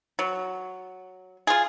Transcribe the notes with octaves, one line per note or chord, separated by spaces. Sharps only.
F#3
F4 G#4